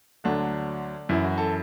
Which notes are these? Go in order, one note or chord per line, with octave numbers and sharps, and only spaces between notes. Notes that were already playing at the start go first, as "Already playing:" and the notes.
D2 D3 F#3 D4
F#2 E3 E4
F#4
A4